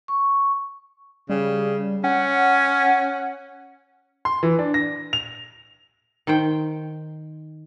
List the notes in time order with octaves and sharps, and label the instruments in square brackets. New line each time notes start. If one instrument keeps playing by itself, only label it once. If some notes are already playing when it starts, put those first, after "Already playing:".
[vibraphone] C#6
[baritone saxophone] C#3 [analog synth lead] G3
[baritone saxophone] C#4 [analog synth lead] F#5
[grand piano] C6
E3
D4
A#6
F7
[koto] D#3 C5 G5